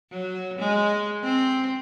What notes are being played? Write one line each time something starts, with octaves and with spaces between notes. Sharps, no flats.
F#3
G#3
C4